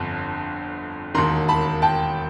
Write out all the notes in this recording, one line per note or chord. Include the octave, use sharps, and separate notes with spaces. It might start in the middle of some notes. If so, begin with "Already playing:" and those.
Already playing: G1 F2 D3
E1 D#2 D#3 A#5 C6
A5 B5
G5 A5